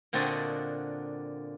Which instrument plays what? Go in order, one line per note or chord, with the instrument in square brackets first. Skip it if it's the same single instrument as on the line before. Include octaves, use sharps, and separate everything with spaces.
[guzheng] A#2 D3 C4 D4 F#4 D#5